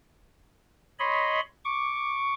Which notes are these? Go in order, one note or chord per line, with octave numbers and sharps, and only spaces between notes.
C#5 D#5 B5 C6
C#6 D6